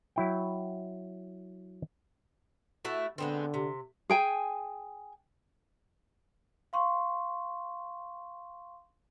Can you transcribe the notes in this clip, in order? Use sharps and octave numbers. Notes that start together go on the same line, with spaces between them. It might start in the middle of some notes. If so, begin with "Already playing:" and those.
F#3 E4 G5
A3 E4 F#4
D3 G#3 B3 C4
C3
G#4 G5 G#5
F5 C6 C#6